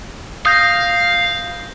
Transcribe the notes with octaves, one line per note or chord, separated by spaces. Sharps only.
F5 D#6 G6 A#6